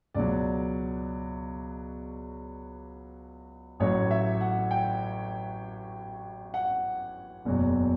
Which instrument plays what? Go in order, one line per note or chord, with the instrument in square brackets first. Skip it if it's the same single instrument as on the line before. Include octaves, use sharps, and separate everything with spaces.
[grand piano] C#2 B2 F#3 D5
A1 A2 F#3 C#5
E5
F#5
G5
F#5
F#1 E2 B2 F#3